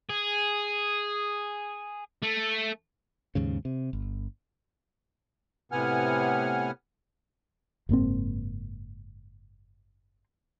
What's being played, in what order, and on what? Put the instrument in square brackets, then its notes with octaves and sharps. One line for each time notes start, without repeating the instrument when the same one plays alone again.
[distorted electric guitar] G#4
A3
[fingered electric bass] D#2 G#2 C#3
C3
G1
[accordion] A2 C3 B3 F#5 G#5 F6
[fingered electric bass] F#1 G#2 A#3 C4